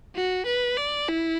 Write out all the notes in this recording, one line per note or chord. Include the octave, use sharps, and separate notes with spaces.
F#4
B4
D5
E4